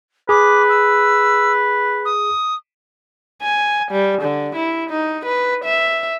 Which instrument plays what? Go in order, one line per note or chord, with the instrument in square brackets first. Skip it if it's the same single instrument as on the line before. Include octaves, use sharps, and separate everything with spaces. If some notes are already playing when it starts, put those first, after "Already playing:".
[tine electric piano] G#4 [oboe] B4 [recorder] D6
[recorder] E6
D#6
[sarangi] G#5
G3
D3
E4
D#4
B4
E5